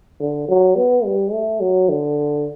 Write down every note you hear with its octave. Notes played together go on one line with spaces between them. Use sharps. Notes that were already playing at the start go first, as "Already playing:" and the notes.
D3
F#3
B3
G3
A3
F#3
D3